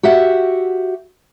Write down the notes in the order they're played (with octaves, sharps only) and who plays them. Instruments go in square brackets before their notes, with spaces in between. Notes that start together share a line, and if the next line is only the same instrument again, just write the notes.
[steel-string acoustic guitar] F#4 G4 E5 F#5